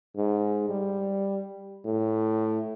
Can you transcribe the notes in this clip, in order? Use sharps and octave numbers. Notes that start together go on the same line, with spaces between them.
G#2
G3
A2